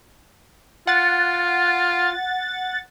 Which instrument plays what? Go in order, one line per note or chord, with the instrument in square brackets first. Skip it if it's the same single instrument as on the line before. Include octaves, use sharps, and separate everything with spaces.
[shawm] F4 [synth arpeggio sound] F#5 A6